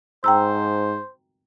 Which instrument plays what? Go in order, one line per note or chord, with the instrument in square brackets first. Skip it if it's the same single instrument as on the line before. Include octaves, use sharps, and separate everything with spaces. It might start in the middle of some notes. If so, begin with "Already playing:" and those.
[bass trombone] G#2 [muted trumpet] C5 [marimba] G5 A#5 E6